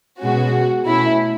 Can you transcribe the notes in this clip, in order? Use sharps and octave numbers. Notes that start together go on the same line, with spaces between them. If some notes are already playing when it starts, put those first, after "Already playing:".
B2 G#3 C#4 F#4
B2 A3 C#4 E4